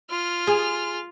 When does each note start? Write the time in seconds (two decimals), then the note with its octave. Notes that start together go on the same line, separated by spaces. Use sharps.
0.10 F4 F6
0.47 G#4